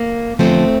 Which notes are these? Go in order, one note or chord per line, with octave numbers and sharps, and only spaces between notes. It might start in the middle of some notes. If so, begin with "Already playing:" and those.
Already playing: A#3
E2 D3 F3 A3 C4